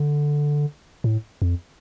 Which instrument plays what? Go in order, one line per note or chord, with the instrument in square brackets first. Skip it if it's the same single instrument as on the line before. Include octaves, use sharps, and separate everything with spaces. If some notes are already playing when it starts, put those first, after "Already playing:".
Already playing: [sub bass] D3
A2
F2